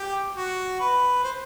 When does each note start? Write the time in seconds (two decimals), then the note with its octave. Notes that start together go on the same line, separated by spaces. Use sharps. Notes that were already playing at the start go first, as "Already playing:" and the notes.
Already playing: G4
0.36 F#4
0.80 B4
1.24 C5